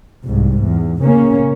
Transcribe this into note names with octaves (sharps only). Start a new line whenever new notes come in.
C2 G#2
E2
C#3 A#3 C#4